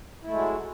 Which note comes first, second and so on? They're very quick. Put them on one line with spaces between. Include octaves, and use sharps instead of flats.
E4 A3 G#3 F#3